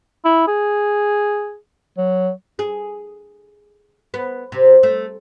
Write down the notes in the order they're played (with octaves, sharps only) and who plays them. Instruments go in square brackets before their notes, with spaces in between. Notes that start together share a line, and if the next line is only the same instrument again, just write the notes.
[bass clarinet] E4
G#4
F#3
[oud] G#4
B3
C3
A3